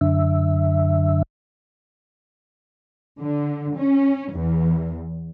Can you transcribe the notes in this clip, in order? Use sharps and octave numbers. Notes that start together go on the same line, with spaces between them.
F#2 D3 E5
D3
C#4
E2